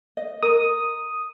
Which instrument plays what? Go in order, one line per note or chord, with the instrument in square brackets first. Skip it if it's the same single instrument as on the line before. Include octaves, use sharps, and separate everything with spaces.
[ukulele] D#5
[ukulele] A#4 [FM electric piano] D#6